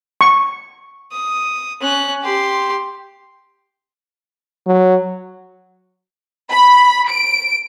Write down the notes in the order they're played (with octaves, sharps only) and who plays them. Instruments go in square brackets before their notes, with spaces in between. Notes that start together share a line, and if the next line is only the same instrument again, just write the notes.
[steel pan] C#6
[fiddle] D#6
C#4 F#6
G4 C6
[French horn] F#3
[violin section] B5
D7